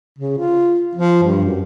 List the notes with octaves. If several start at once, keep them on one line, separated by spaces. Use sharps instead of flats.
C#3
F4
F3
G2
F#2